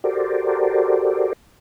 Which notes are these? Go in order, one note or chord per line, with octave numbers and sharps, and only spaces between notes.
F#4 G4 A4 A#4 C5 D5